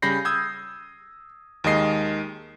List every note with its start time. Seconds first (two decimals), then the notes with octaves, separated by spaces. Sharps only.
0.02 C#3 G3 B5 G6 A#6 C7
0.25 D#6 E6 G6 G#6
1.64 D#2 D#3 G#3 D#5 C7